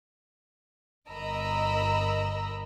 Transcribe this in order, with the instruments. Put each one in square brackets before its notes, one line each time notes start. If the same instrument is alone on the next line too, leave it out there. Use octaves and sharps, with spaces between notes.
[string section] G1 A#4 D#5 A#5 B5 E6